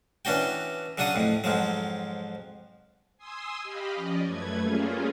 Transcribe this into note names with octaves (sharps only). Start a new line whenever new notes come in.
E3 C#4 D4 F#4 G5
C#3 F#3 D4 F#5 D#6
F2 A2
F2 G#2 F3 F#3
G#5 C6 D#6 E6
G4 D#5 F5 B5
F3 C#4 D5 D#5
F#2 A3 B4 G#6
G3 A3 A#3 C#4 F4 G#4